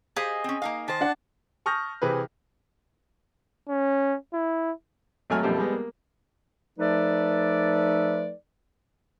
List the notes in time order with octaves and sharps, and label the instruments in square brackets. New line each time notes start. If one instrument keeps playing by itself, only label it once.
[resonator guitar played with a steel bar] G4 C5 F5 [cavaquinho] G#4 D#5
[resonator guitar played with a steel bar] C4 C#4
A#3 D#4 F5
[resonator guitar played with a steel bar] D#3 C5 [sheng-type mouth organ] A5
[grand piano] D4 F#5
A5 C#6 D#6 F6 G6 A#6
C3 E3 G#4 B4
[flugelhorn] C#4
E4
[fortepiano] G#1 F#3 A3 G#5 F6
F#2 B2 F3 G3 A3 G4
G3 G#3 B3
A#3
[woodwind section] F3 A3 D#4 A4 B4 D5